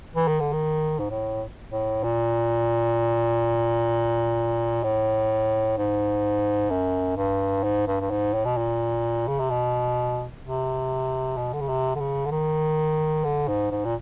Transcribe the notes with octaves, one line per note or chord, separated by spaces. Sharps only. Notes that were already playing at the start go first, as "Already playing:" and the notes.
E3
D#3
D3
D#3
G#2
A2
A2
A#2
A2
G#2
F#2
G2
G#2
G2
G2
G#2
A2
B2
A#2
C#3
C3
B2
C3
B2
D3
C#3
C3
D3
C#3
D3
D#3
D3
G#2
G#2
A#2